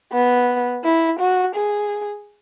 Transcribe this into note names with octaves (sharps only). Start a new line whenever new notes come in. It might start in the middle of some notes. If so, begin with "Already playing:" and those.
B3
E4
F#4
G#4